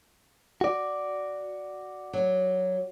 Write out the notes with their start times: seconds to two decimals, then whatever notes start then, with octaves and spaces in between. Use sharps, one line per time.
0.61 F#4 D5
2.13 F#3